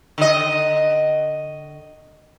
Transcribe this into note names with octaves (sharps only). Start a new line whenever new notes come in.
D3 D#5